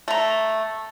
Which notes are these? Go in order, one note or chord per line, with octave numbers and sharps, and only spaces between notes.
A3 A#5